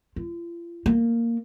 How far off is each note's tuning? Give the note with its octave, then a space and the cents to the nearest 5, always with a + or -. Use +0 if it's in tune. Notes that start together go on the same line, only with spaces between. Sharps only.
F4 -40
A#3 -10